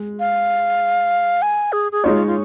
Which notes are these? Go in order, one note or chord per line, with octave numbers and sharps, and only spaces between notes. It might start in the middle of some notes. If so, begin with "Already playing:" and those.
Already playing: G#3
F5
G#5
G#4
G#4
G#3 D#4 F4 C#5
F4